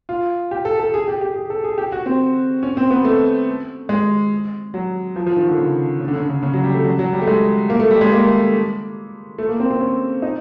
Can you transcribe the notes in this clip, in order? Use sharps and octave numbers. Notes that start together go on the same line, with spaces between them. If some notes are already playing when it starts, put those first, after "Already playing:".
F4
G4
A4
A4
G#4
G4
G4
G#4
A4
G#4
G4
F#4
C4
C#4
C4
B3
A3
G#3
F#3
F3
F3
D#3
D3
C#3
C#3
D3
C#3
D3
C#3
C#3
F#3
G3
A3
F#3
F#3
G3
A3
G#3
A#3
A3
G3
G#3
A#3
A3
A#3
C4
C4
C#4
D#4